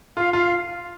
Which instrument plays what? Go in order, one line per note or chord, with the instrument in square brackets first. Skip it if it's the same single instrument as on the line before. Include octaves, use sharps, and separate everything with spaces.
[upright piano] F4 [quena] F5
[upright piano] F4 [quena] F5